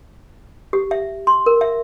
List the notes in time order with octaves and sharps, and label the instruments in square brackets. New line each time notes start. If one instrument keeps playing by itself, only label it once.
[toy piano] G4
E5
C6
A#4
E5